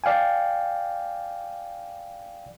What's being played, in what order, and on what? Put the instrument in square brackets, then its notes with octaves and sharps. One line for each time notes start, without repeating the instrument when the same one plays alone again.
[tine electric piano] D5 F5 G5 G#5